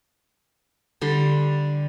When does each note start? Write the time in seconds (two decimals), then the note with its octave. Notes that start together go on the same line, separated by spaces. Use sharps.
1.01 D3 G3 C6